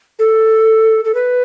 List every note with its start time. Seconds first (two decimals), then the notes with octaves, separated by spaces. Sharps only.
0.19 A4
1.05 A4
1.15 B4